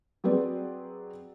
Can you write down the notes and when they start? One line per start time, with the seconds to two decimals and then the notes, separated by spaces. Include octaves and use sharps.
0.24 F#3 C4 G#4 B4 D5